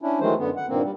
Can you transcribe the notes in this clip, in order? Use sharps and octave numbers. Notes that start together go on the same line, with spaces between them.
C#4 D4 E4
D#3 E3 F#3 G#3 A3 C5
F#2 D3 B3
F#5
G2 A#2 D#3 A#3 C4
G3